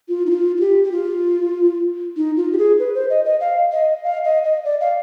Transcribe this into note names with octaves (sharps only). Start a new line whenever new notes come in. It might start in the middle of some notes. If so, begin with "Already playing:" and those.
F4
D#4
F4
F4
G4
G4
F4
D#4
F4
G4
G#4
B4
C5
D#5
D#5
F5
D#5
F5
D#5
D#5
D5
F5